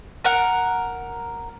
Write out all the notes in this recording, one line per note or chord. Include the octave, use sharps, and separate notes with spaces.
A#4 F#5